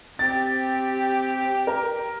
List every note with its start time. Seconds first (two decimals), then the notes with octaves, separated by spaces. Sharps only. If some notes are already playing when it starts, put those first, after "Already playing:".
0.19 C4 G4 A6
1.67 A#4